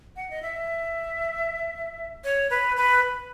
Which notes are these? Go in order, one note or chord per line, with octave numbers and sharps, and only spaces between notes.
F#5
D#5
E5
C#5
B4
B4